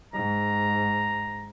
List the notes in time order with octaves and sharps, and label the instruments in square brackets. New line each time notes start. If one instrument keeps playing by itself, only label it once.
[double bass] G#2 [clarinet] A#5